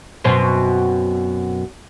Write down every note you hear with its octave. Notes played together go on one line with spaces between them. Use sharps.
F#2 B2 C4